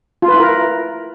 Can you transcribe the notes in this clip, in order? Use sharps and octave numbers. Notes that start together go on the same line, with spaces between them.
F4
B4
E4
A#4